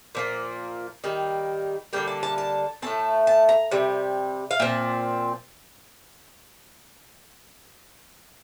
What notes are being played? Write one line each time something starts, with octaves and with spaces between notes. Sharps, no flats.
A#2 F3 A#3
D#3 G3 A#3
D3 G3 A#3 G5
A5
A5
A5
A2 A3 C4 A5
A5
A#5
C3 G3
F5
A#2 F3 C4